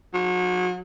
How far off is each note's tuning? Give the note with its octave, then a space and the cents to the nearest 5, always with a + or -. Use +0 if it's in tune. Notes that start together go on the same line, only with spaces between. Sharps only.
F#3 -35